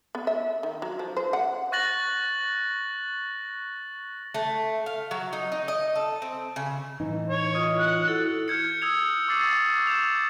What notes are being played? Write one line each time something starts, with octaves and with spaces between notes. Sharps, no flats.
B3
E5
D#3
F#3
F3
C5
F#5
C#6 F#6 A6 A#6 F#7
A3
F5
F#3
D#4
D#4
D#5
A4
C4
C#3
A2 E3 D#4
C#5
F4 D#5 D#6
F#5
E4 F#4 A4
F6 G6 G#6 C#7
D#6 E6 G#6 C#7 F7
C#6 D6 E6 A6 C7 F#7
G6 E7 F7